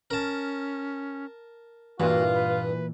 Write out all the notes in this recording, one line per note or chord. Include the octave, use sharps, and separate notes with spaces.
C#4 A#4 A5
G2 A#2 E3 F4 F#4
B4